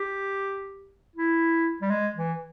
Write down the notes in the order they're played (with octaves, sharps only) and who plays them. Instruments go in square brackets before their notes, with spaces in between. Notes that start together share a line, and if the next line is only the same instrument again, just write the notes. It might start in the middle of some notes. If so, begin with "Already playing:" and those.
Already playing: [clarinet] G4
E4
G3
G#3
E3